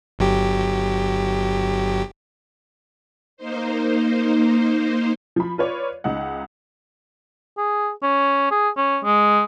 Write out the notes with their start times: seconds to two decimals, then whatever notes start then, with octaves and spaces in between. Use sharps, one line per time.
0.19 G1 F#3 G4
3.37 A#3 D#4 C5
5.36 F3 B5
5.58 F4 B4 C#5 D5
6.04 C#2 D#4 F#5
7.57 G#4
8.03 C#4
8.51 G#4
8.77 C#4
9.04 G#3